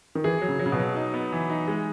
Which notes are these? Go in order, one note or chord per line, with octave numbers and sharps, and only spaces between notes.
D#3
E3 G#4
F#3
C#3
F#3
C#3
B2
F#3
D#4
B3
E3
D#4
G#3